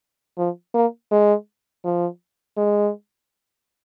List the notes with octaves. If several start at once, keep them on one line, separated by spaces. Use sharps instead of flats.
F3
A#3
G#3
F3
G#3